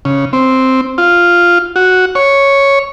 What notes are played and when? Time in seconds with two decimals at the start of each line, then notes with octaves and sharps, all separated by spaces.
0.05 C#3
0.33 C4
0.98 F4
1.76 F#4
2.15 C#5